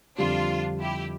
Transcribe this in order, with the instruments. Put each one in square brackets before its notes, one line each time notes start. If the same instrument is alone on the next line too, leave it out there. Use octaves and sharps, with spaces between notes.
[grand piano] F2 D3 G3 C4 [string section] D4 F4
[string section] E4 G4